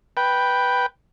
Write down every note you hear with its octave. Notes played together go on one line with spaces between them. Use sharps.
B4 G5